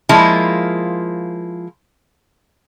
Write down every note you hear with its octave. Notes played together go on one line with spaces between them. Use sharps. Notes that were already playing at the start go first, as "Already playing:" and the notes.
F3 G#3 A#3 E4 F4